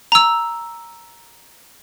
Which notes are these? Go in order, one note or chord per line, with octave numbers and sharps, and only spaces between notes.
A#5 E6